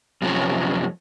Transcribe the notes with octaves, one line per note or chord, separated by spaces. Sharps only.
F#2 C3 F3 C#4 C#5